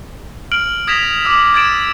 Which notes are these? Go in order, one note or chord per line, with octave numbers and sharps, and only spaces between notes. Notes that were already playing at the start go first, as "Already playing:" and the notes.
F6 D7 F#7
D#6 G#6 A#6 B6 E7 F7
D6 E6
G#6 A6 D7 E7